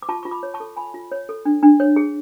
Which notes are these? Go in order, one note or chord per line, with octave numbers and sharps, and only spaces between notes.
D6
F4 A5 C#6
F4 C#6
B5 D6
C#5
A5 C#6
A4
F4 G#5 B5
F4
C#5
A4
D4
D4
C#5
G#4